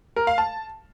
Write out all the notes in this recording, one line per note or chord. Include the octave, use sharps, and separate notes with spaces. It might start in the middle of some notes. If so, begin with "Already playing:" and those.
A#4
F5
A5